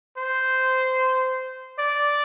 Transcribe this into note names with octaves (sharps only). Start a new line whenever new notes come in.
C5
D5